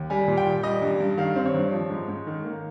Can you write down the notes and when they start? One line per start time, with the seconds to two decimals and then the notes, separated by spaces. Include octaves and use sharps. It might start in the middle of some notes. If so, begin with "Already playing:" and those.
Already playing: D#2
0.10 G3 G#5
0.28 A#2
0.37 G5
0.47 A#2
0.63 G3 D#5
0.82 G2
1.01 G2
1.18 D#3 F5
1.36 C4
1.46 C#5
1.54 G2
1.73 F3
1.90 G#2
2.09 G#2
2.27 D#3
2.45 A#3